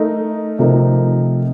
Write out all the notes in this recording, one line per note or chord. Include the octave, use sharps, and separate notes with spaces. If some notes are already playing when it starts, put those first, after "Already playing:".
Already playing: A3 D#4 A#4
C3 F3 A3 D#4 A#4